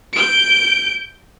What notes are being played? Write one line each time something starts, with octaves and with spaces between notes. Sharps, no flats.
G6 D7